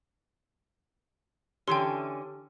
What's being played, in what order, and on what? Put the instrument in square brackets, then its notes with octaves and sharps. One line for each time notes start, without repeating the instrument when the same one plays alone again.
[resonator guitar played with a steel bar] D3 E3 C#4 [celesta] G4 [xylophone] G5 C6